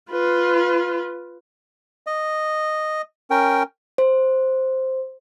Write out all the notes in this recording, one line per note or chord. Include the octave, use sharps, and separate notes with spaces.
F4 B4
D#5
C#4 A#4 G5
C5